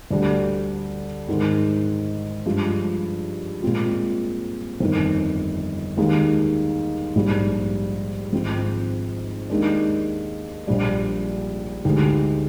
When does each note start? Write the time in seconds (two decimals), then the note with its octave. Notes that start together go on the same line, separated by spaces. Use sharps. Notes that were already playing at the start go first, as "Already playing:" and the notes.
0.11 D2 D3 G3 D4 G4
1.29 G#2 D#3 G#3
2.46 G2 F3 G#3
3.62 A#2 G#3 C4 F4
4.80 G1 F2 D#3
5.97 D#2 D#3 G#3 D#4
7.15 A#1 G#2 G3
8.33 G#1 G#2 F3 C4
9.50 D#2 D#3 G#3 D4
10.67 A#1 A#2 G3 D4
11.85 D2 D3 G#3 D#4 G4